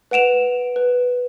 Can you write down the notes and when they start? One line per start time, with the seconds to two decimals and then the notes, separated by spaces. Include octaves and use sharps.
0.11 B4 F#5 D7 E7 F7
0.76 B4